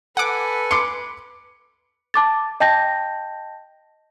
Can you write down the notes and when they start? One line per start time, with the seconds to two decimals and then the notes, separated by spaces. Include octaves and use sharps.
0.17 A4 B4 F#5 G#5 D6
0.71 C6 D6 C#7
2.14 A5 D6 A6
2.60 D#5 G5 A5 G6 A#6